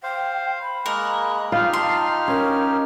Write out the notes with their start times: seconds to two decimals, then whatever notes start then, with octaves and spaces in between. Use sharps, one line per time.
0.03 C5 F5 G5
0.61 B5
0.86 G#3 A#3 A#4 F#6
1.52 D#4 F4 G4 F6
1.74 A5 C6
2.28 C#4 A#4